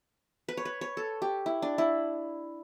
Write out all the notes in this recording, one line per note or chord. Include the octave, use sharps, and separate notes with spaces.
B4
C#5
B4
C#5
A4
G4
E4
D4
E4